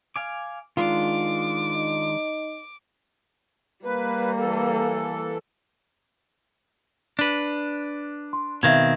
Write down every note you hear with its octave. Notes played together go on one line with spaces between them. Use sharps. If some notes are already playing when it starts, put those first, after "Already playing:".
F5 G#5 D6
D#3 G#3 D4 F4 D6
D#4
G3 A#3 B4
E3 A4
D4 B4
C6
B2 D#3 C4 E5 F5 G#6